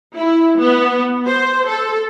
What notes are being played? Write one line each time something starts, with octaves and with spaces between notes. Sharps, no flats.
E4
B3
C5
A4